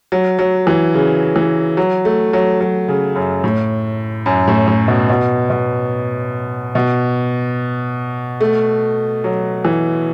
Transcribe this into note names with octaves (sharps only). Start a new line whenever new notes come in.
F#3
F#3
E3
C#3
E3
F#3
A3
F#3
F#3
C#3
F#2
A2
F#2
A2
A2
B2
B2
B2
B2
A3
F#3
E3